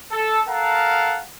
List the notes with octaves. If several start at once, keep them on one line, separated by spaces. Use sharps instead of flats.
A4
A4 A#4 F5 F#5 A5 A#5